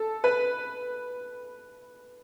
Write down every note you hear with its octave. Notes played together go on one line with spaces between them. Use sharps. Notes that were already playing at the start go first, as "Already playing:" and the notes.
Already playing: A4
B4